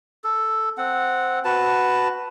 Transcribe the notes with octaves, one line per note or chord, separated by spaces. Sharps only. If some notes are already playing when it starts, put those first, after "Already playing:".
A4
C4 F#5
F#4 B4 A5